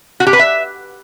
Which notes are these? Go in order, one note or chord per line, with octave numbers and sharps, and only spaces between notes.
F#4
G4
B4
E5